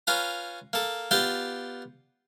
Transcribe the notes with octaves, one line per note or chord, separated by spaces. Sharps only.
C#4 F4 B4 A#5
A#3 A4
B3 F4 G4 D5 G5